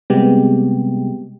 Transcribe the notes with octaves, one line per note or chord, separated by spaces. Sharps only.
C3 G3 G#3 B3 G4